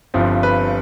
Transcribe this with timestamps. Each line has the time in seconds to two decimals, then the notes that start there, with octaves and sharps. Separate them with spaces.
0.14 G1 G2 F3 C4
0.43 B4